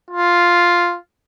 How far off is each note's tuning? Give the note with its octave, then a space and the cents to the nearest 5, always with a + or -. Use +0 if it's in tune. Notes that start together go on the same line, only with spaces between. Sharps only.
F4 +0